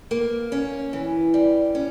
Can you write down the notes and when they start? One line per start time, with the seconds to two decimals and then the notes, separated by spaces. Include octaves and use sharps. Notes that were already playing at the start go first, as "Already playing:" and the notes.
0.11 A#3
0.52 C#4
0.93 E3
1.34 G3
1.75 C#4